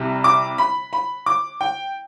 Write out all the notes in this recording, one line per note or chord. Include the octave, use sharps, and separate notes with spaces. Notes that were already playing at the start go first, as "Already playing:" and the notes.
Already playing: C2 C3 G3
D6
B5
B5
D6
G5